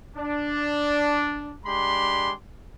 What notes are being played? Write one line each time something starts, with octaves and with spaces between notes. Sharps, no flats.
D4
G#3 D4 G4 B5 C6